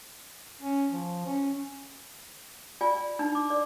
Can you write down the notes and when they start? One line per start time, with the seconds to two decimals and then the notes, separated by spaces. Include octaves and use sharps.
0.61 C#4
0.91 F3
1.25 C#4
2.81 F4 D5 G#5
3.19 D4 D#4
3.35 D6
3.50 D5